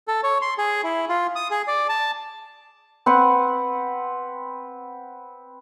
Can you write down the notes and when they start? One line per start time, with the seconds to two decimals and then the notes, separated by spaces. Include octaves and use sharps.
0.08 A4
0.23 C#5
0.42 C6
0.58 G#4
0.84 E4
1.09 F4
1.36 D#6
1.51 G#4
1.67 D5
1.89 A5
3.06 C4 B4 F#5